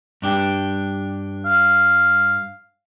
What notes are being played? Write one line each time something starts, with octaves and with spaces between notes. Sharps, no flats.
G2 D4 G4
F5